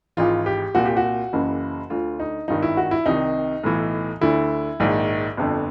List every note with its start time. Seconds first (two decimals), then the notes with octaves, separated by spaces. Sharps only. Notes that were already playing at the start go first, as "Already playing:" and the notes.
0.17 G#1 G#2 E3 F4
0.46 G4
0.75 C2 A#2 F#4
0.86 G4
0.97 F#4
1.33 F#1 F#2 C#3 E3
1.90 D2 D3 F4
2.20 D#4
2.48 G#1 G2 D#3 D#4
2.63 E4
2.77 F#4
2.91 E4
3.06 C2 C3 D#3 D#4
3.63 B1 A2 E3
4.21 D2 D3 E4
4.80 A#1 G#2 D#3
5.37 G1 F2 D3